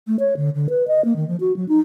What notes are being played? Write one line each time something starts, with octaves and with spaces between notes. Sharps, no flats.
A3
C#5
D3
D3
B4
D#5
A#3
D#3
F3
F#4
F#3
D#4